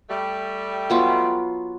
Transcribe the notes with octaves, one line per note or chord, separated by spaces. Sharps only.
G3 A3
F#3 B3 F4